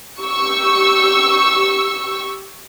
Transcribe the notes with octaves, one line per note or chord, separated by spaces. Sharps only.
G4 C#6 E6